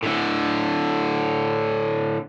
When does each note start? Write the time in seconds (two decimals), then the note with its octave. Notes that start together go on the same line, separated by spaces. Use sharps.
0.03 A2 D3